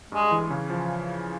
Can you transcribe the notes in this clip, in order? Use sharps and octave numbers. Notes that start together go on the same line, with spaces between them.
G2 G#3
E3
C#3
F3